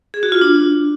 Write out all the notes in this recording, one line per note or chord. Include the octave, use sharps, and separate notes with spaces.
G#4
F#4
F4
D4